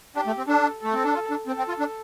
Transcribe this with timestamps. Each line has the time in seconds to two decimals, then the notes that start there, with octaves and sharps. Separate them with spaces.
0.16 D4 G4
0.27 A3
0.38 C4
0.48 D4 A4
0.81 A3 A4
0.93 C4
1.04 D4
1.14 F4
1.30 D4
1.47 C4 A4
1.58 C4
1.68 F4
1.79 D4